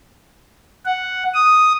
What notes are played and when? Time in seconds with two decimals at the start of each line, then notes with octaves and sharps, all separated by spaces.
0.86 F#5
1.34 D#6